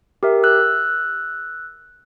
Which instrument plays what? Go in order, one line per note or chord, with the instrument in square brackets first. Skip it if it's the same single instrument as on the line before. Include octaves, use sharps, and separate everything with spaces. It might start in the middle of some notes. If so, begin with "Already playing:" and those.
[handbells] G4 A#4 E5
E6 F#6